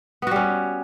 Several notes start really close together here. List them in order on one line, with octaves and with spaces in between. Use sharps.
B3 F#4 G3 C#4